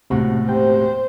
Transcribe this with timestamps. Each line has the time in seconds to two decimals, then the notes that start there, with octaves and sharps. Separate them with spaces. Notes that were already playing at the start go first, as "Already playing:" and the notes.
0.10 E1 A2 C3 F#4
0.49 C3 C5 G5